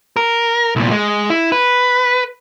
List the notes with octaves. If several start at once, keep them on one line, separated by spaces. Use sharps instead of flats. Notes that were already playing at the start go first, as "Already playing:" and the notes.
A#4
C2 A#2
G#3
E4
B4